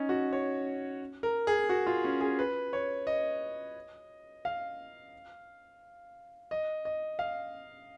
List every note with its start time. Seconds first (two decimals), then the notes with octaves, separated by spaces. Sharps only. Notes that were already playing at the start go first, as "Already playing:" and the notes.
Already playing: C#4 D#4
0.09 F#4
0.33 C#5
1.23 A#4
1.47 G#4
1.69 F#4
1.87 F4
2.04 C#4
2.21 G#4
2.39 B4
2.73 C#5
3.07 D#5
4.45 F5
6.51 D#5
6.85 D#5
7.19 F5